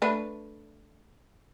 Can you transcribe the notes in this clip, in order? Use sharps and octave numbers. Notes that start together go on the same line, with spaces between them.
A3 D4 B4